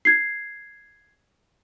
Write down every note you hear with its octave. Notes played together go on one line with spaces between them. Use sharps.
G#6 C7